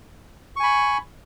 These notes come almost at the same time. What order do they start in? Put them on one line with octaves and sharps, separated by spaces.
C#6 G#5 B5